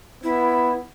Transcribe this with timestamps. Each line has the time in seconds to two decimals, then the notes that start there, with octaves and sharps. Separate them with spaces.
0.24 B3 E4